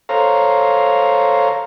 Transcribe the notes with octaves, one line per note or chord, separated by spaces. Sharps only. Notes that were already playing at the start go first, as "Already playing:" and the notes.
A4 C5 C#5 F5 A#5